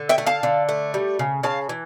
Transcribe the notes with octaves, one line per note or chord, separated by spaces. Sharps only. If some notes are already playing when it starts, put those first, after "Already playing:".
Already playing: D3
E5 G5
A3
F5 A5
D3
A3
G3
C#3
C#3 F5 A5
E3